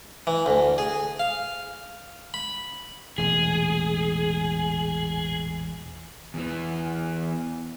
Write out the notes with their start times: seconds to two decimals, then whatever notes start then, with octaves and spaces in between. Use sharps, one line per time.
0.27 E3
0.46 D2
0.78 G#4
1.19 F5
2.34 B5
3.18 E1 A1 A#2 G#4
6.34 E2 E3